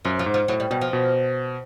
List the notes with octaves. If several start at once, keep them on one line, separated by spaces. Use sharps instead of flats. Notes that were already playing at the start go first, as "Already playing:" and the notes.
F#2 F3
F3
G#2
F3
A2 F#3
G3
B2 G3
F3
B2